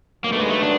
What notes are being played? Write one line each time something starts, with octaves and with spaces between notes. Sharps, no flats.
D#2 D3 F#3 A#3 B3
A3
G#3
A3
D4